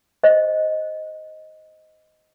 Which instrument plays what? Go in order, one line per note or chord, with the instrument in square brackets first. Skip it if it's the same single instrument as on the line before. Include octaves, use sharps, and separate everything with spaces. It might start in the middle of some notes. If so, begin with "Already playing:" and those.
[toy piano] C5 D#5